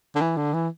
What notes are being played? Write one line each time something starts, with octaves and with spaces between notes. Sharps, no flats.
D3
E3
D3
E3